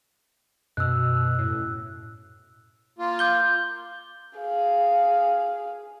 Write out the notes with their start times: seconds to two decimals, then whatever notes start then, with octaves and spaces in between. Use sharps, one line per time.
0.77 F#2 B2 E6 F#6
1.39 A2
2.99 A#3 F4
3.19 D6 G6 G7
4.38 G#4 F5